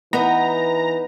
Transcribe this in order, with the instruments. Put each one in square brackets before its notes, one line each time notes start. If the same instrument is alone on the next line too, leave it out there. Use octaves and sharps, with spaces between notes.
[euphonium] E3 [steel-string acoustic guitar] B3 D#4 [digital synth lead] A#5